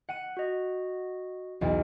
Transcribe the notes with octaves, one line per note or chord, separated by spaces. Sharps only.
F#5 D#7
F#4 D#5
B1 E2